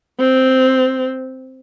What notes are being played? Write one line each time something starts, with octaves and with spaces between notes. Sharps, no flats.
C4